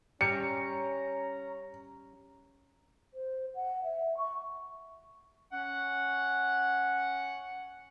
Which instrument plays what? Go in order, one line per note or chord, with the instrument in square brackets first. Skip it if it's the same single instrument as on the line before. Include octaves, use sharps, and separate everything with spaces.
[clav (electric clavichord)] G3 [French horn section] C#4 [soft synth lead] A#5 [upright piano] C#7
[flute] C5
F#5
E5
C#6
[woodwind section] C#4 F#5